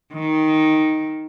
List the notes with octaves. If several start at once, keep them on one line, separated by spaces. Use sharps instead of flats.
D#3